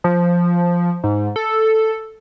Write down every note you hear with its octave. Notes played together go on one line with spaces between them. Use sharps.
F3
G#2
A4